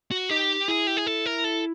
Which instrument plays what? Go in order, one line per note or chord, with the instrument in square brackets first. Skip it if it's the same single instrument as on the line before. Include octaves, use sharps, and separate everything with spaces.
[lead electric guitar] F#4
[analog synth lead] D#4 [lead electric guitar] G4
[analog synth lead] E4 [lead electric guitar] G#4
[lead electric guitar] G4
G#4
A4
A#4
A4